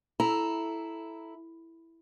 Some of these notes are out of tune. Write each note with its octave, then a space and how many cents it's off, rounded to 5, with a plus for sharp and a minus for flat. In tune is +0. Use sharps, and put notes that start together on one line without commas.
E4 +0 A4 -10 A#5 +0